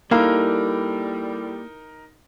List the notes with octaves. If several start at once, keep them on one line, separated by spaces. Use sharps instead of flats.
G3 A#3 D#4 E4 A4 A#4 F5